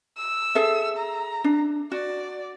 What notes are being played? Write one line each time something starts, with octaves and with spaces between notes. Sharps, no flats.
E6
G#4 A4 E5
A#5
D4
F#4 D5